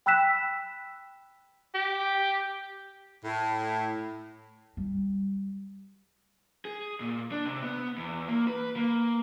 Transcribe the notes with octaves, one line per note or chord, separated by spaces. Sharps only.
G5 B5 E6 F#6 B6 E7
G4
A2
G3
G#4
A#2
D4
C3
B3
E2
A#3
B4
A#3